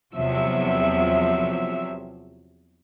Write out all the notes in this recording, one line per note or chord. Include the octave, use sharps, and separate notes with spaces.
E2 C3 F3 F#3 E5